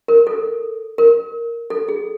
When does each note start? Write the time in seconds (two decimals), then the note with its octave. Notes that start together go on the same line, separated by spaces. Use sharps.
0.08 A#4
0.27 A4
0.98 A#4
1.70 A4
1.89 G#4